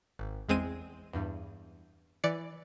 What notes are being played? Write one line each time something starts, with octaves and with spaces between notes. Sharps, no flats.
G#1
E2 G#3 C4 D#7
E2 G2
E3 D5 C#7